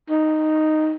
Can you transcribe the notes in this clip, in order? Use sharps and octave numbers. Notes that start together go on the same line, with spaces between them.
D#4